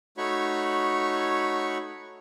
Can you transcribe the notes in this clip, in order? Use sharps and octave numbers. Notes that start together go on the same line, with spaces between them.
A3 D#4 F#4 C#5 B5 C#6